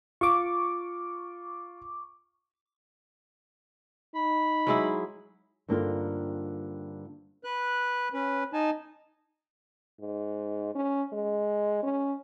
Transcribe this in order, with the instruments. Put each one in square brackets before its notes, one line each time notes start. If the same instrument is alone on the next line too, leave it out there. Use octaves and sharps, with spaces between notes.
[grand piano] F4 [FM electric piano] C#6 D6
[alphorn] D#4 [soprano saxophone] B5
[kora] F#3 G#3 E4
[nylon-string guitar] G2 D3 A#3 C4 D#4 F4
[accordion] B4 F#6
C#4 B4
D#4 G#5 A5
[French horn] G#2
C#4
G#3
C#4